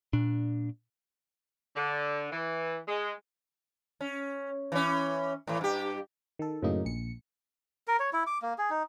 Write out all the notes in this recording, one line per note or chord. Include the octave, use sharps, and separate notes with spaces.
A#2 D4
D3
E3
G#3
C#4
E3 C#4
A2 E3
G2 G4
D#3 A4
F#2 A2 C#3 E3 A#3 D#4
A#1 C#7
A#4
C#5
E4
D6
A#3
G#4
D#4